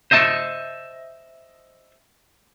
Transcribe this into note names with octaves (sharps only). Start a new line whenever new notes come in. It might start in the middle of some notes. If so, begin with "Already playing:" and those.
C5 D#5 E5 A5